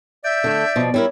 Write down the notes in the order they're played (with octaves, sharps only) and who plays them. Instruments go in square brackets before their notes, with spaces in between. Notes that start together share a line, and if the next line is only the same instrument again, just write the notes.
[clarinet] D5 [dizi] E5 [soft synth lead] G6
[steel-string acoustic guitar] D3 A3
B2 F3
[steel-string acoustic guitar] G3 E4 A#4 [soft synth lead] C#5